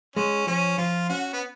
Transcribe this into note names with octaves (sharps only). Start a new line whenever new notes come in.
G#3 C#4
F3 C#4
F3 F4
C#4 F#4
B3